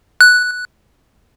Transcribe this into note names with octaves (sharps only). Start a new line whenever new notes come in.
F#6